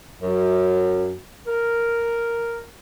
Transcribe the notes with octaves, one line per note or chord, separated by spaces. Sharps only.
F#2
A#4